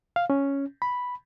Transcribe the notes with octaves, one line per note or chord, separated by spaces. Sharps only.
F5
C#4
B5